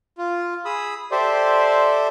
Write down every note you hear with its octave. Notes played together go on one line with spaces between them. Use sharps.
F4
G#4 B5 D#6 E6
G4 A4 C5 D5 E5 C6